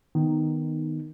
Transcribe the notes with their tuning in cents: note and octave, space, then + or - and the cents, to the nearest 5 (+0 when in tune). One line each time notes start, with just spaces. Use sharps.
D#3 +0 B3 +5 D#4 -10